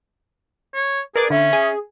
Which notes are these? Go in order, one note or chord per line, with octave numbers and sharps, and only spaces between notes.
C#5
G#4 A#4 B4 D5 D6
D3 C#4 E5
G#4